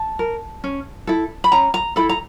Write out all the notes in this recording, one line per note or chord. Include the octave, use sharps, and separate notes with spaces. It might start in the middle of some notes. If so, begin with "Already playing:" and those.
Already playing: A5
A#4
C#4
E4 A4
B5
C#4 A#5
A#5
E4 A4 B5
A#5